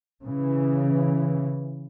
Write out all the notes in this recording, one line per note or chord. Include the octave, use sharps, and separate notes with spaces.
C#3 E3